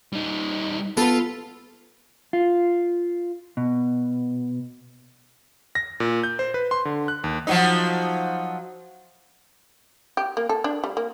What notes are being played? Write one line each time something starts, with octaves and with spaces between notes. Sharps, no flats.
G3 D#4
B3 F4 A4 B4
F4
B2
A#6
A#2
G6
C5
B4
C6
D3
F#6
D#2
F3 F#3 D#4
G4
A#3
A4
D4
G3
A#3